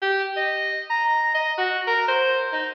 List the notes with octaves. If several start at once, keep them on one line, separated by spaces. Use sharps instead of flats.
G4
D#5
A#5
D#5
F#4
A#4
C5
D#4